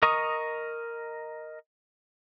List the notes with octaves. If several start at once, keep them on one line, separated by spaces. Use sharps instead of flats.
A#4 D#5 A#5 C#6 D#6